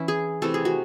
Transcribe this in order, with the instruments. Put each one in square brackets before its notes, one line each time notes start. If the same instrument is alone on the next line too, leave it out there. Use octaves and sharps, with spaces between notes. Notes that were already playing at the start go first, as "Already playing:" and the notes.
Already playing: [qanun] E3 C#4 E4
G#4
C3 E3 A3 A4
G#4
F#4